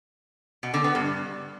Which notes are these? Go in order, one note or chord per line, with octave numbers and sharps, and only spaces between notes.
B2
D3
B3
G2